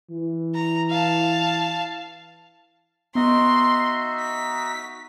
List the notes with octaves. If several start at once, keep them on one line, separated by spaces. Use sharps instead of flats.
E3
A#5
F5 A5
B3 D#4 F#4 D#5 E5 C6
B6